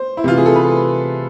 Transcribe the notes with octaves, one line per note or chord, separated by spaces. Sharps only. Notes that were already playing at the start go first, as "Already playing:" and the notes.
Already playing: C5
E4
C3 E3 F4
G#4
A4
B4